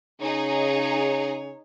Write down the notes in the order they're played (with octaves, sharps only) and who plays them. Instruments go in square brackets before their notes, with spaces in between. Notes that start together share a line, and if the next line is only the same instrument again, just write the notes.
[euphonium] C#3 [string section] D#4 G#4 [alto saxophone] C#5